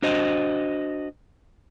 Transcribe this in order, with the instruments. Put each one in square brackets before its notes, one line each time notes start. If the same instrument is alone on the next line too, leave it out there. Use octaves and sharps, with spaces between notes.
[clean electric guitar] D4 F#4 C5 D#5